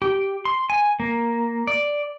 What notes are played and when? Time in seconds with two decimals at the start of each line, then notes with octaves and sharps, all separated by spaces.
0.02 G4
0.45 C6
0.70 G#5
1.00 A#3
1.67 D5